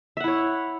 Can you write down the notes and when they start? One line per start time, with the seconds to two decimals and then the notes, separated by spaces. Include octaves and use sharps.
0.17 E5
0.20 F#5
0.24 E4
0.28 C#5